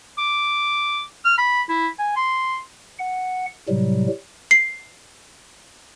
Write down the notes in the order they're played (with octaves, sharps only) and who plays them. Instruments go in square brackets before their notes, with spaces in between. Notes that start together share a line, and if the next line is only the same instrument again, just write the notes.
[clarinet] D6
F6
B5
E4
G#5
C6
[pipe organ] F#5
A2 C3 F#3 G3
[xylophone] C7